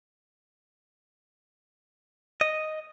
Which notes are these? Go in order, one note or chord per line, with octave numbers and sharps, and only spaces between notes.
D#5